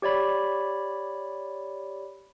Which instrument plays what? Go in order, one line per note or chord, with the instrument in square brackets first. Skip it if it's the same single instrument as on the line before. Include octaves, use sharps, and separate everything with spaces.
[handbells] G4 C#5 D5 B5